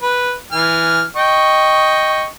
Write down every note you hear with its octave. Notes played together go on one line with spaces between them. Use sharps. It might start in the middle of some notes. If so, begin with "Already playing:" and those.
B4
E3 G#5 F6
D#5 G5 C#6